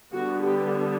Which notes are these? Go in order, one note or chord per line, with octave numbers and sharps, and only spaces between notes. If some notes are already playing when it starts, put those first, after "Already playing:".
D3 G3 B3 F#4
G4